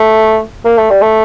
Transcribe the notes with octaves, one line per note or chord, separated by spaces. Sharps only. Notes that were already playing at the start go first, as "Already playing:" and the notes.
Already playing: A3
A#3
A3
G3
A3